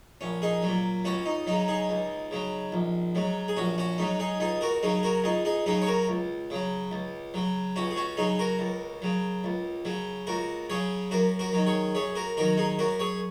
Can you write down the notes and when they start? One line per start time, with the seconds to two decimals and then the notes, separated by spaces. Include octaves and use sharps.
0.21 A#1 C#4
0.42 D#4 G#4
0.63 A#2 F#3
1.05 C#2 C#4 F#4
1.26 D#4
1.47 C#3 F#3 D#4
1.68 D#4 G#4
1.89 C#2
2.31 C#3 F#3
2.73 A#1
3.15 G#2 F#3
3.48 G#4
3.57 A#1 C#4 F#4
3.78 C#4 F#4
3.98 G#2 F#3 D#4
4.20 D#4 G#4
4.40 C#2 D#4 G#4
4.61 F#4 A#4
4.83 C#3 F#3 D#4 G#4
5.03 F#4 A#4
5.24 C#2 D#4 G#4
5.45 D#4 G#4
5.66 C#3 F#3 D#4 G#4
5.82 C#5
5.87 F#4 A#4
6.09 C#2
6.50 C#3 F#3
6.91 C#2
7.34 C#3 F#3
7.76 C#2 C#4 F#4
7.91 G#4
7.96 C#4 F#4
8.17 C#3 F#3 D#4 G#4
8.39 F#4 A#4
8.59 C#2
9.02 C#3 F#3
9.44 C#2
9.85 C#3 F#3
10.27 C#2 F#4 A#4
10.70 C#3 F#3 G#4 C#5
11.11 F#2 F#4 A#4
11.39 F#4 A#4
11.53 D#3 F#3
11.67 G#4 C#5
11.95 F#2 G#4 C#5
12.15 F#4 A#4
12.37 D#3 F#3 F#4 A#4
12.57 D#4 G#4
12.79 F#2 F#4 A#4
13.00 G#4 C#5